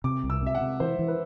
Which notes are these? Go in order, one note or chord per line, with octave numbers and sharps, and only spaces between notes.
C3 D6
C2
E6
C3 E5
F#5
C3
E3 C5
E3
B4